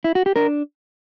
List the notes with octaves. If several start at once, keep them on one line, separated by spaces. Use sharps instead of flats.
E4
F#4
G4
D4 A#4